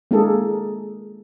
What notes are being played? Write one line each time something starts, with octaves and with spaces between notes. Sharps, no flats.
G#3 A#3 D4 E4 G#4 A4